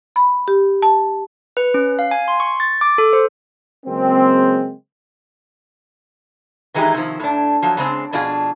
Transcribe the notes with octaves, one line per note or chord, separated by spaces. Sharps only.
B5
G4
A5
B4
C#4
F5
G#5
C6
C#6
A6
D6
A4
C5
C#3 F#3 G#3 A#3 C4
D#3 E3 G#3 D#4 G4
C3 D#3 F3
A2 D4
F3 F#3
C#3 G#3 C4 D4
F2 B2 D4 F4 G#4